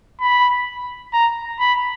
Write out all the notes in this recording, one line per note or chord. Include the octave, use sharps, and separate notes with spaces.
B5
A#5
B5